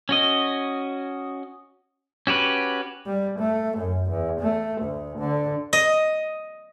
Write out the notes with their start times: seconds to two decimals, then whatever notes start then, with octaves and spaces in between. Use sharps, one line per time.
0.09 C#4 F#4 D#5
2.27 C#4 F#4 G4 B4
3.06 G3
3.39 A3
3.78 F#2
4.10 E2
4.40 A3
4.82 D2
5.19 D3
5.73 D#5